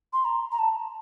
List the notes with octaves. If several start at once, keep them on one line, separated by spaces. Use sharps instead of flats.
C6
A#5
A#5
A5